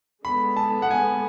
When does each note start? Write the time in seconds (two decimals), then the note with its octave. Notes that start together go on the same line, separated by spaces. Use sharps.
0.24 D3 G#3 B3 B5
0.57 A5
0.82 F#5
0.90 G#5